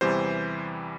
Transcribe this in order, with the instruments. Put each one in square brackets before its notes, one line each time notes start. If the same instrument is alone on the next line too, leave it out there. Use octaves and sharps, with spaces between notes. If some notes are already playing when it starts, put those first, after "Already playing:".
[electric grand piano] E2 C3 E3 G3 C5